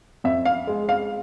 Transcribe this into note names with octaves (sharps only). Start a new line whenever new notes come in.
F2 E5
F5
G#3
F5